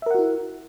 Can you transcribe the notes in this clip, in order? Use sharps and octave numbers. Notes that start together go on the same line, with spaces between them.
E4 F#4 A#4 E5 F#5